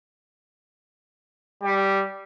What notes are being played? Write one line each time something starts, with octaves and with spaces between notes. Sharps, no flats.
G3